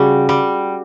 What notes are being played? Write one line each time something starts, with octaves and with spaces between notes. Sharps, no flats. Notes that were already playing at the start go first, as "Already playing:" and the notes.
Already playing: C#3 G3 F#4
G3